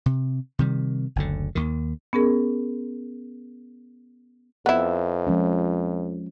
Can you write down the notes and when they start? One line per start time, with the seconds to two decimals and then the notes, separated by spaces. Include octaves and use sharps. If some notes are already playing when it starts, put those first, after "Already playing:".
0.06 C3
0.59 C3 D#3 G3
1.16 F#1 D2 D3
1.55 D#2 D#3
2.13 B3 C#4 G#4 A#4
4.66 F2 B3 E4
5.27 F3 G#3 C#4